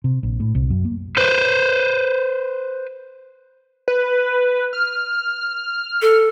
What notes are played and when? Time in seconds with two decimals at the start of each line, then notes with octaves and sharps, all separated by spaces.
0.04 C3
0.23 A#1
0.40 A2
0.55 C2
0.70 F#2
0.85 A#3
1.17 B4 C5
3.88 B4
4.73 F6
6.02 A4